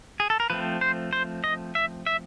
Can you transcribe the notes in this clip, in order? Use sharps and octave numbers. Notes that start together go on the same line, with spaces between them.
G#4
A4
A#4
F3 A3 C4 B4
C5
C5
D#5
E5
E5